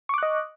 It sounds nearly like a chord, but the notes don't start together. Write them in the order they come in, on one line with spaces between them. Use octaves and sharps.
C#6 D6 F#6 D#5